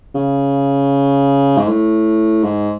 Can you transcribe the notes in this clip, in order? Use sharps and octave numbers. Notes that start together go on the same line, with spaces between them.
C#3
G#2
A2
G#2